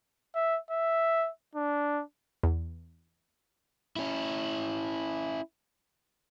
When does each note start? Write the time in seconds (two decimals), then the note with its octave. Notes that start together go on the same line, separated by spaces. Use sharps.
0.35 E5
0.71 E5
1.55 D4
2.43 E2
3.96 C#4 E4